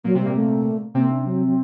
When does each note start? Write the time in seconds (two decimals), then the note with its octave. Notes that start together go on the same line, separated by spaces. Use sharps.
0.04 A#2 F#3 A#3
0.15 C3 C4
0.20 G3
0.25 A#2 A#3
0.35 A3
0.94 C3 A#3 C4
1.10 D4
1.24 F#3
1.47 F#3